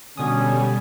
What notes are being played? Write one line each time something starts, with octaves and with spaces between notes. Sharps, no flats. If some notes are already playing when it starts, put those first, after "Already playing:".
B2 D3 G3 C#4 G#5 D#6